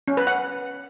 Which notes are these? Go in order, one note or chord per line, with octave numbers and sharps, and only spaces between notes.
C#4
B4
F#5